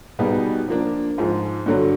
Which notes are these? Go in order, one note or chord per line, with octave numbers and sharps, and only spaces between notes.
B2 G3 B3 D#4 G#4
F3 A#3 D4
G#2 F3 G#3
G2 D3 F#3